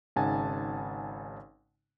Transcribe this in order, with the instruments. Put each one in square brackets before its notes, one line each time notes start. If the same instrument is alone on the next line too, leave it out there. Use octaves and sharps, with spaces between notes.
[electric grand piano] G#1 C#3 D#4 F#5 G#5 A5